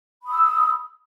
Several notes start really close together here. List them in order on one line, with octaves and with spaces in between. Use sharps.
B5 D#6 E6